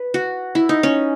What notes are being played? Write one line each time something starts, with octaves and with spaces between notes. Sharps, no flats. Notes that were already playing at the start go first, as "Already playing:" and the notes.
Already playing: B4
F#4
E4
D#4
C#4